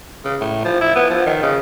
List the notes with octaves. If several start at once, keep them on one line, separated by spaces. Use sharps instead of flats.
C#3
A2
F3
E4
B3
F3
D#3
C#3